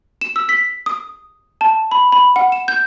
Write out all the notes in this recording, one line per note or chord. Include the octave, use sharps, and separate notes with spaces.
E7
E6
B6
D#6
A5
B5
B5
F#5
E7
G6